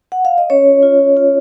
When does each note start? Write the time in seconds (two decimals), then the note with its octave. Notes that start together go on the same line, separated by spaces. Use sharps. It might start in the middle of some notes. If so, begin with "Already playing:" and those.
0.12 F#5
0.25 F5
0.38 D#5
0.50 C#4 C#5
0.67 F4
0.83 F4
0.99 F4
1.17 F4